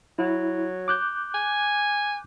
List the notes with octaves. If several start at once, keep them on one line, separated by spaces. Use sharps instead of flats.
F#3 E4
D6 F#6 G6
G#5